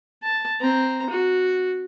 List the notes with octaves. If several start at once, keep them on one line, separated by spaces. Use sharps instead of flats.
A5
C4 A#5
F#4